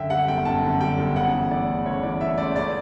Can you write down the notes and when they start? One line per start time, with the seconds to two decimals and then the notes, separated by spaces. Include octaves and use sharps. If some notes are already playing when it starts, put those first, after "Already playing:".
Already playing: F#2 D3 E5 G5
0.10 G3 F#5
0.28 G1 G5
0.45 F#2 A5
0.63 D3
0.81 G3 G5
0.98 G1
1.16 C#3 F#5
1.33 E3
1.51 A3 D5
1.69 C#2
1.86 C#3 C#5
2.03 E3 D5
2.20 A3 E5
2.38 C#2 D5
2.56 C#3 D5